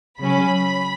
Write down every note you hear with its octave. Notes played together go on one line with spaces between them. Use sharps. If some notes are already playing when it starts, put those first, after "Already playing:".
C#3 F#3 C#4 B5